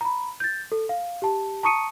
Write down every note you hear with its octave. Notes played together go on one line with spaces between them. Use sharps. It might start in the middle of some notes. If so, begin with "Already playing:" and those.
A#5 B5
G6 A6
A4
F5
G4 A5
A5 A#5 C#6 D#6 C#7 D#7